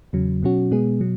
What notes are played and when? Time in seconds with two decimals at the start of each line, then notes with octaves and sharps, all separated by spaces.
0.13 E2 C#3 F#3
0.43 B2 F#3 C#4 F#4
0.71 B2 G#3 B3 G#4
1.01 B2 F#3